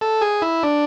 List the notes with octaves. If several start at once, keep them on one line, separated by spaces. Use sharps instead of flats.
A4
G#4
E4
D4